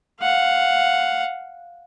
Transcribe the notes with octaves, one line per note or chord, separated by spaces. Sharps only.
F5 F#5